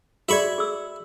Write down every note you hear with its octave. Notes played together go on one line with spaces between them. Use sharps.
F#4 G#4 D5 E5 B5 C#6
G#4 E6